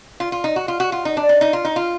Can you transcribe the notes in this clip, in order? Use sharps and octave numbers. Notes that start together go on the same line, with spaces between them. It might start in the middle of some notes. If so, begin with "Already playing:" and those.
F4
F4
D#4
F#4
F4
F#4
F4
D#4
D4
D#4
D#4
F4
D#4
F4